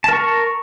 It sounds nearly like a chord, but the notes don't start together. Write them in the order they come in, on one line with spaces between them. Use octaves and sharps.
A5 A#4 C#6